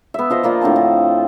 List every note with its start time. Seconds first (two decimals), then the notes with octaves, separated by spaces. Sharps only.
0.14 B3 E5
0.30 F3 C5 D#5
0.43 F3 A#3 F4 D5
0.61 A2 D3 C4 A5
0.76 D#5